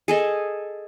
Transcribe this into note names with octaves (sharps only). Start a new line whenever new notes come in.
G#4 A4 D#5